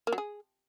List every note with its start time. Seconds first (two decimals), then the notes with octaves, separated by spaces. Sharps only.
0.07 A#3
0.13 F#3
0.18 G#4